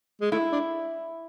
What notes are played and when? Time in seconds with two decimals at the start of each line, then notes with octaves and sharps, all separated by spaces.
0.21 G#3
0.32 A3 E4
0.52 D4